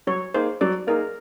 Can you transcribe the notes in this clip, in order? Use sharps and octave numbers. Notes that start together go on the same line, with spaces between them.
F#3 C#5
A#3 D#4 G#4 C5
F#3 D5
A#3 D#4 G#4 A#4